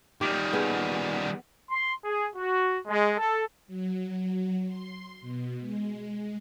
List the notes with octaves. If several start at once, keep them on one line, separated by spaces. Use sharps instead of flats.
D#3 G3 G4
B3 G#4
C6
G#4
F#4
G#3
A4
F#3
C6
B2
G#3